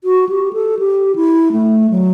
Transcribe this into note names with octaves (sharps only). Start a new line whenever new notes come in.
F#4
G4
A4
G4
E4
A3
F#3